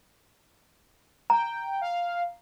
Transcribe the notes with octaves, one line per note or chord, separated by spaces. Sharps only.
G5 A#5
F5